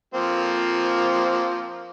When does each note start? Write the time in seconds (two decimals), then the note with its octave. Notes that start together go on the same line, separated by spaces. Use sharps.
0.14 F3 A#3 C4